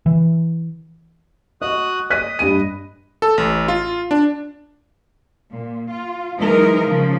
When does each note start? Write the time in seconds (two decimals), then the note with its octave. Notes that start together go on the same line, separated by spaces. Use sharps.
0.06 E3
1.62 F#4 D#5 D#6 F#6
2.10 D#5 D#6 F#6 B6 D#7
2.39 G2 B5 D#7
3.22 A4
3.38 A1
3.68 F4
4.11 D4
5.51 A#2
5.91 F4
6.38 E3 F#3 G#3 D#4 A#4
6.87 C#3 F3